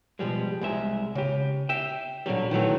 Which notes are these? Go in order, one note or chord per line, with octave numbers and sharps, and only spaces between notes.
B2 F3 G3 G#3
C2 G#3 E5
C#3 G4
E5 G5
A#2 D3 F#3 G3
D#3 E3 F#3 A3